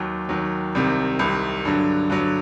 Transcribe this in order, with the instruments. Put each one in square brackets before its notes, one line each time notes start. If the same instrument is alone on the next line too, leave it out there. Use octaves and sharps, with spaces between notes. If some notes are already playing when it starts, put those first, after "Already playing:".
Already playing: [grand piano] D#2 D#3 F#3
D#2 D#3 F#3
C2 C3 D#3
C2 C3 D#3
G2 D3 F#3
G2 D3 F#3